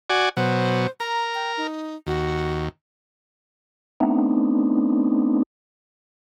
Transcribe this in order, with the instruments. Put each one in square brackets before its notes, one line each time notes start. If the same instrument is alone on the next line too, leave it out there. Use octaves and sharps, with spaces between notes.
[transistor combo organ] F#4 D5 G#5
[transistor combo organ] B2 F#3 [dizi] C5
[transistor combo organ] A#4 [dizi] A#5
[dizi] G5
D#4
[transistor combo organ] D#2 [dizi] F#4
[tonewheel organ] A3 B3 C4 D4 D#4